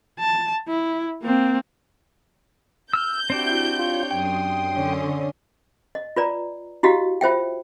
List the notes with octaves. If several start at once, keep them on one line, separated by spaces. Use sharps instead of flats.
A5
E4
A#3 C4
E6 F6 G6
C4 D4 E4 F#4 G4
F4 C#5
F#2 G5 C6 D#6
D3 C#4
D#5
F4 B4 D5 A#5
E4 F#4 G4 D#5 F5
F4 C5 E5 G5